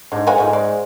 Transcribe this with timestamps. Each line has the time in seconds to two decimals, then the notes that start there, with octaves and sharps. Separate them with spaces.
0.12 G#2 D4
0.27 A#4 F#5 G#5
0.38 G#2 F3 A3
0.53 G#3 D5